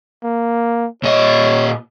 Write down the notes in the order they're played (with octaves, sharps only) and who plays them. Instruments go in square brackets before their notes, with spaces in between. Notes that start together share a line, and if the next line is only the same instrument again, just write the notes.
[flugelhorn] A#3
[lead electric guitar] A#2 D#5 [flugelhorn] C#5